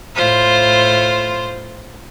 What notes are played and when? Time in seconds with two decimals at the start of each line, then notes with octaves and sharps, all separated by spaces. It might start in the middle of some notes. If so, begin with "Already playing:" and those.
0.16 A2 F4 C5